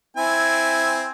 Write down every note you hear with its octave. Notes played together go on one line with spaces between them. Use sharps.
C4 E4 G#5